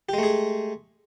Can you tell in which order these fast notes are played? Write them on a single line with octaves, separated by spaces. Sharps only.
G4 G#3 A3 G#4